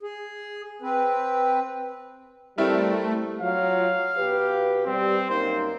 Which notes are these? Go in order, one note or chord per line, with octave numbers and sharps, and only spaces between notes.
G#4
C4 B4
G3 A3 C4 E4 A#4
F#3 F4 F5
B2 G4 B4
G3 C4 G4
F#2 A#3 D#4 C5